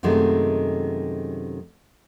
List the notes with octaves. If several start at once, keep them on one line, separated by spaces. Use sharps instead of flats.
F#2 C3 D#3 G#3 A3